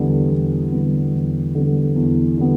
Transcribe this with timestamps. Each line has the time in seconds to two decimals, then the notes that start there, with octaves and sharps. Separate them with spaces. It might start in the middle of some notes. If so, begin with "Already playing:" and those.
Already playing: E2 D3 G3 B3
0.31 E2
0.72 D3 G3 B3
1.13 E2
1.55 D3 G3 B3
1.96 E2
2.37 D3 G3 B3